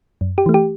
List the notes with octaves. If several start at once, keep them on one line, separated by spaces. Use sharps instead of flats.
F#2
G4
E3 A3
G4